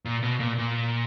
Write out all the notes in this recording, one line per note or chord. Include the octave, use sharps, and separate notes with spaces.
A#2
B2
A#2
A#2